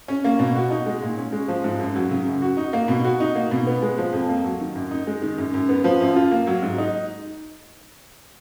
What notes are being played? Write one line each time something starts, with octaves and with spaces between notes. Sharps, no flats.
C#4
A#3
B2
F#4
D#4
G#3
A#2
C#4
G#3
F3
G#2
F#2
F#3
C#3
F#2
F#4
D#4
A#3
B2
F#4
D#4
A#3
B2
B3
G#3
F3
F2
A#3
F#3
D#3
F#2
D#4
G#3
D#3
F#2
F#2
B3
F3
F#2
F4
A#3
F#3
G#2
D#4